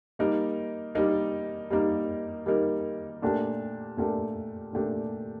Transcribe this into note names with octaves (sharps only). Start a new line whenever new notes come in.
G3 A#3 D#4 A#4
G3 A#3 D#4 A#4
G3 A#3 D#4 A#4
G3 A#3 D#4 A#4
A#2 A3 D4 G4 A#4
A#2 A3 D4 G4 A#4
A#2 A3 D4 G4 A#4